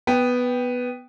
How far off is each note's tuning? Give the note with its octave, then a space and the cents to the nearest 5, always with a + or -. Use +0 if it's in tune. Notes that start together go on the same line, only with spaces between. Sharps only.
B3 +0 G5 -5